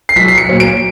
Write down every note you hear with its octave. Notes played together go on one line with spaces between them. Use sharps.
C7
B1 B6
C7
C#7
A#2 F#3 A#3
D7